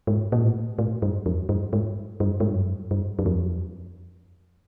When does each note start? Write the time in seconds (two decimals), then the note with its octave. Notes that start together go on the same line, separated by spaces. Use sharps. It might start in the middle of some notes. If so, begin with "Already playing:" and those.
0.07 G#2
0.32 A#2
0.43 A2
0.79 A2
1.02 G2
1.26 F2
1.49 G2
1.73 G#2
2.20 G2
2.40 G#2
2.48 G2
2.55 F#2
2.91 G2
3.19 F#2
3.26 F2